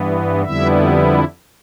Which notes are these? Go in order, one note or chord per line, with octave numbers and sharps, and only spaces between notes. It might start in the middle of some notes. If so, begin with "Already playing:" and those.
Already playing: G2 E3 B3
F2 D3 G3 B3 E4 E5